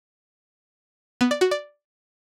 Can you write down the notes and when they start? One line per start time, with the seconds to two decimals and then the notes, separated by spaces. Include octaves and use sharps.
1.21 B3
1.31 D5
1.41 F#4
1.51 D5